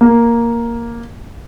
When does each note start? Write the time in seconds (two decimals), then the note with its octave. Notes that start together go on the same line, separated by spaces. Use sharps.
0.01 A#3